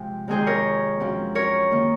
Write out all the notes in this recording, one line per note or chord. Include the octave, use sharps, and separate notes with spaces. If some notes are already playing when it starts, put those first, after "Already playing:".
Already playing: C3 F3 G#3 C4
F2 C3 D#3 G#3 C4 G#4 C5
A#4 C#5
F#2 F3 C4
A#4 C#5
D#3 A#3